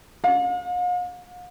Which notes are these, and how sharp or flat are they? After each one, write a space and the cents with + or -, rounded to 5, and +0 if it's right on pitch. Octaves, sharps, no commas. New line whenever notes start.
F5 +45